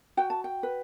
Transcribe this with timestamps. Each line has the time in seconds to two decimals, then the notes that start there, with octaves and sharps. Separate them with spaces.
0.17 F#4 G5
0.30 A5
0.44 G5
0.63 B4